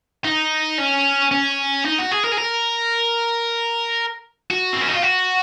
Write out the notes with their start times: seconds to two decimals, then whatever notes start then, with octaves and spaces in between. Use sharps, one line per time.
0.25 D#4
0.79 C#4
1.31 C#4
1.85 D#4
1.98 F#4
2.11 G#4
2.24 A#4
2.32 G#4
2.38 A#4
4.50 F#4
4.73 C4
4.81 C#4
4.88 D#4
4.96 F4
5.03 F#4